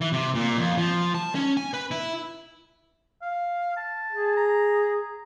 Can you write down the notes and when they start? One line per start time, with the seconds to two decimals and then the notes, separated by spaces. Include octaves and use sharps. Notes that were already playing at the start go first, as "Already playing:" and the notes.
0.01 E3
0.13 C3
0.35 A#2
0.57 F2
0.77 F3
1.15 A5
1.35 C#4
1.57 G#5
1.74 B4
1.91 E4
3.22 F5
3.77 A5
4.12 G#4
4.37 A#5